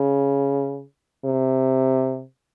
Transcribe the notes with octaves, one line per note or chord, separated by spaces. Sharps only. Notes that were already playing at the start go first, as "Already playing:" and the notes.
Already playing: C#3
C3